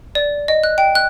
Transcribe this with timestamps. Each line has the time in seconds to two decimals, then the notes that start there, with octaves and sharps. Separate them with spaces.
0.15 D5
0.48 D#5
0.64 F#6
0.78 G5
0.95 F#6